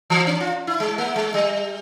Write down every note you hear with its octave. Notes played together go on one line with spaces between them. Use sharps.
E3
C#4
F4
E4
G#3
A#3
G#3
G3